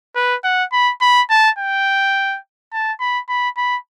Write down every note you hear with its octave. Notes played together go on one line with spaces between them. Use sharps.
B4
F#5
B5
B5
A5
G5
A5
B5
B5
B5